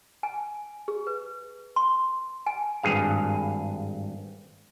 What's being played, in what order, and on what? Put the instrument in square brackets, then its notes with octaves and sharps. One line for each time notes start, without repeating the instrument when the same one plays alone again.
[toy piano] G#5
G#4
B4
C6
G#5
[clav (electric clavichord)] G#1 G2 G#4 F5